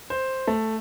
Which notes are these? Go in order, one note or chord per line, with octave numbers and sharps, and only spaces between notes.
C5
A3